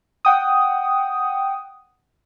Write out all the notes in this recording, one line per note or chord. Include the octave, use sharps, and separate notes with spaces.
F#5 G5 D#6